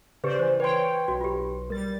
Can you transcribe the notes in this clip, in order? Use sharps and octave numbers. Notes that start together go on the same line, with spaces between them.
C#3 G4 G#4 B4 C5 D5
E3 C5
B4 C#5 G5 C6
B1 F#4
F4 G4
G3 A#4 A6